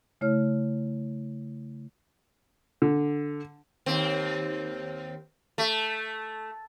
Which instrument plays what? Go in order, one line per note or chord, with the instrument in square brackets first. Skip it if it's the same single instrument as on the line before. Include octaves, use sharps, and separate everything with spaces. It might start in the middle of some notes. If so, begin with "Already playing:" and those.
[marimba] C#3 A3 E4 C#5 F6
[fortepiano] D3
[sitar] D#2 C4
A3